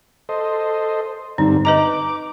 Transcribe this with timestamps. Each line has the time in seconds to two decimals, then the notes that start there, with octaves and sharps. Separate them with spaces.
0.29 A4 C5 D#5
1.38 G2 D3 C4 D#4
1.65 B4 D#5 A#5 D6